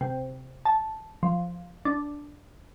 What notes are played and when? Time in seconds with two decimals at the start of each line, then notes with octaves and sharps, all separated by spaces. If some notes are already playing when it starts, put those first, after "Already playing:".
0.01 C3
0.65 A5
1.23 F3
1.85 D4